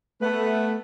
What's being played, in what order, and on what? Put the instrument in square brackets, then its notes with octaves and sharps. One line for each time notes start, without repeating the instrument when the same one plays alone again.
[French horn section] A3 [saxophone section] B3 B4